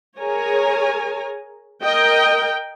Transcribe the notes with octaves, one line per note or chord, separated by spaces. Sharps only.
G#4 A#4 C#5 G#5 A#5
A#4 D#5 G5